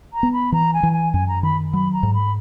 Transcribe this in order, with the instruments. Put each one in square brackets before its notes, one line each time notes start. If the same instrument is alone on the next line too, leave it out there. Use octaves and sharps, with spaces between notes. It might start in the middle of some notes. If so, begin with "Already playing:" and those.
[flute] A#5
[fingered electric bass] B3
[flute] B5
[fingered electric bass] E3 [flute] A#5
[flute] G#5
[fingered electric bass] E3
[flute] G#5
[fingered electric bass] F#2 [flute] G#5
[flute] A#5
[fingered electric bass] D#3 [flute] B5
[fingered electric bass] F#3 [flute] B5
[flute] A#5
[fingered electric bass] G#2
[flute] B5